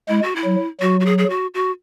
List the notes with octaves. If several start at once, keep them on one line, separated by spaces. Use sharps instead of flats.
G#3 E4
F#4
E4
F#3
F#3 F#4
F#4
G#4
G#4
F#4
F#4